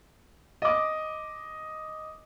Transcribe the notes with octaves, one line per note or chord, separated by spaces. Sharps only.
D#5 D6